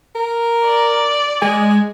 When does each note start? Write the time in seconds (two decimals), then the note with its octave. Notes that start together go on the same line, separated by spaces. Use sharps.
0.15 A#4
0.65 D5
1.42 G#3 G#5